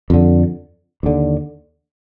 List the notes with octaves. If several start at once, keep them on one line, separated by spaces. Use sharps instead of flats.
F2 D3
D#2 D3